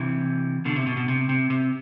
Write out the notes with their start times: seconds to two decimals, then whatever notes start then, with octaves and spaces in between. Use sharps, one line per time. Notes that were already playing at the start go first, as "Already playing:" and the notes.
Already playing: C3 E3
0.65 B2 D3
0.76 C3
0.86 B2
0.97 B2
1.08 C3
1.29 C3
1.50 C3